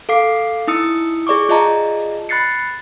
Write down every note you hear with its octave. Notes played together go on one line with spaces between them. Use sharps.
A4 F5 D6 C7
D#4 E4 D#6 E6 C#7
G#4 D5 C#6 D6
F4 G#4 D5 D#5 A5 A#5
B5 F#6 A6 C7 C#7